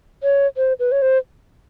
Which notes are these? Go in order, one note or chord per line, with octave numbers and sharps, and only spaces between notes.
C#5
C5
B4
C#5
C5